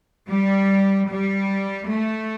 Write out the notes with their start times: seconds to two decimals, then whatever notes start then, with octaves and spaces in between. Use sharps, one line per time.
0.27 G3
1.08 G3
1.89 A3